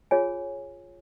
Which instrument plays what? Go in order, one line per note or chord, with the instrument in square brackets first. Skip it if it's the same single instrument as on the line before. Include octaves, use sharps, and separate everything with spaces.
[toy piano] F4 G#4 C#5 G#5